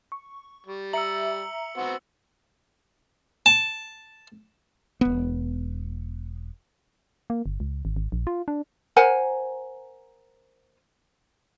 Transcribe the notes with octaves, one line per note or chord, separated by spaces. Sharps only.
C#6
G3
E5 A#5 E6 C#7 F#7
B3 C4 F#4
A5
E1 B3
A#3
G1
C#2
G#1
G#1
A#1
F4
D4
A#4 C5 F#5 G#5